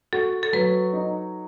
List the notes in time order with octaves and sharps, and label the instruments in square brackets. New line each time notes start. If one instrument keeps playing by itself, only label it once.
[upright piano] F#4 [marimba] A4
[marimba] A4
[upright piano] F#3 [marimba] B4
[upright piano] D#4